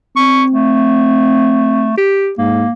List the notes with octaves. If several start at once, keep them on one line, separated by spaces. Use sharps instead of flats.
C4 C#6
A3
G4
G#2 A#3